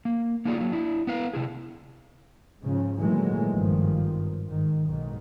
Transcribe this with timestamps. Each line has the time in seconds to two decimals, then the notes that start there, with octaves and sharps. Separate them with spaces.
0.05 A#3
0.45 A#3 D#4 F4 G#4 D5
0.57 F#3 A#3
0.72 D4 E4
1.07 B3 B4 F5
1.33 C3 E4 G#4
2.61 G#2 C#3 F3
2.98 A#2 D#3 E3 F#3 G#3 A3
3.52 G#1 G2 D#3 F3
4.49 G#2 D#3
4.86 B1 G#2 D#3